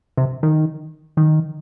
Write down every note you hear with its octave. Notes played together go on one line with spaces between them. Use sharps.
C3
D#3
D#3